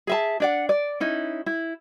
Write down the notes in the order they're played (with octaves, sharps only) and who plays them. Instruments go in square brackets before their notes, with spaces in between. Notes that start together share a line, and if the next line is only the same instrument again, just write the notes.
[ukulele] G#4 E5 A5
D4 D5 F#5
D5
C#4 D#4 E4
E4